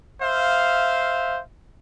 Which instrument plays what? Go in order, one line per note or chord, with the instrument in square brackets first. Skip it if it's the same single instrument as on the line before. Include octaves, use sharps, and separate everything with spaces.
[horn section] C5 E5 F5